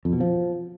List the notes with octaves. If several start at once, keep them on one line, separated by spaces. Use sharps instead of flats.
F2
B2
F3